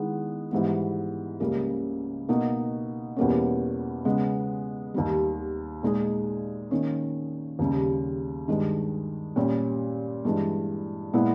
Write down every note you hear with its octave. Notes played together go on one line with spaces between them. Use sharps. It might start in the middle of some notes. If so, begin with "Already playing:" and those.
Already playing: D#3 G#3 B3 E4 G#4
G#2 E3 G3 B3
C#2 C#3 G3 A#3
B2 A#3 D#4
E2 B2 G3 A#3 C#4
C#3 G#3 B3
D#2 D#3 G3
A#2 G#3 D#4 G#4
D#3 A#3 C#4
D#2 C#3 G3
G2 D#3 G#3
A#2 G3 C#4 G4
G2 E3 G#3
A#2 G#3 B3 E4